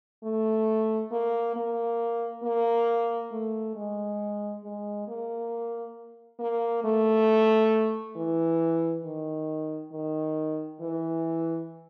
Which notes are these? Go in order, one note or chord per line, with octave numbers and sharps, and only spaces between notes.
A3
A#3
A#3
A#3
A3
G#3
G#3
A#3
A#3
A3
E3
D#3
D#3
E3